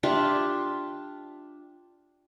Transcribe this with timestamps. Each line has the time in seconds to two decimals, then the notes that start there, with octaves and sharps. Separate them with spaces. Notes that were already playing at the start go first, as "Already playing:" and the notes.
0.03 D4 F4 G4 E5